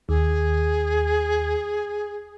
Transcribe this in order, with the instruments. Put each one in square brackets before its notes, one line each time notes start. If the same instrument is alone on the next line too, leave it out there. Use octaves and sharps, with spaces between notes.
[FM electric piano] D#2 [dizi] G#4